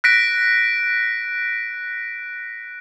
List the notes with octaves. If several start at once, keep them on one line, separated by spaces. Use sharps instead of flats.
F#6 A#6 B6 D7